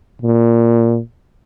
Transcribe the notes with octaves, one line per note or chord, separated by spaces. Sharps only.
A#2